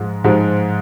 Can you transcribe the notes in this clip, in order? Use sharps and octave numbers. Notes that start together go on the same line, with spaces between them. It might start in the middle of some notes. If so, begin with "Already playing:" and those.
Already playing: G#2 F3 G#3
G#2 F3 G#3